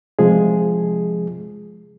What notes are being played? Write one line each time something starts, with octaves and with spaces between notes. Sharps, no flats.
C3 F3 G#3 G#4